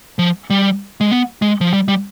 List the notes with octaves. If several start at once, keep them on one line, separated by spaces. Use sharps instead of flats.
F3
G3
G#3
B3
G#3
F3
G3
G3